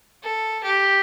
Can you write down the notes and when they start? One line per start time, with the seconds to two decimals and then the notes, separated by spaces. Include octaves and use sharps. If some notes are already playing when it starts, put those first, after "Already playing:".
0.23 A4
0.64 G4